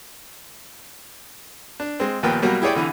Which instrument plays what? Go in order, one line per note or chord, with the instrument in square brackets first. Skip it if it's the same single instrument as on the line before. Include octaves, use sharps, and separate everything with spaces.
[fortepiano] D4
G#3 C4
D#2 A#2 F3 B3 A#4 G5
B2 F#3 G3 A#3
E4 G4 G#4 C#5 D5 G5
C2 D3 E3